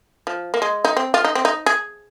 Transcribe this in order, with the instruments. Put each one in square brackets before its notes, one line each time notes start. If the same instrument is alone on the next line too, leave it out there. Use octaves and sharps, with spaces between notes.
[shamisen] F3
A#3
G#3
D#4
C4
F4
D#4
C4
D#4
G#4